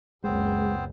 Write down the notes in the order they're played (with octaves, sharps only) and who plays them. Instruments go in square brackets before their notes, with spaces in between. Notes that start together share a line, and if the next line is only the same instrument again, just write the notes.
[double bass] F#1 C#2 [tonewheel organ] G#3 [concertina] B3 C4 C5